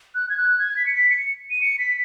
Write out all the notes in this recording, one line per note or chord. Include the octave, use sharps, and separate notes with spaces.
F#6
G#6
F#6
G#6
B6
C#7
B6
C#7
D#7
C#7
B6